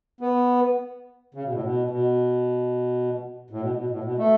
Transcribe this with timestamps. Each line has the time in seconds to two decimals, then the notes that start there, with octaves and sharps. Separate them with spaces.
0.21 B3
1.35 C#3
1.44 B2
1.52 A2
1.62 B2
1.90 B2
3.50 A2
3.61 B2
3.76 B2
3.90 A2
4.04 B2
4.18 A3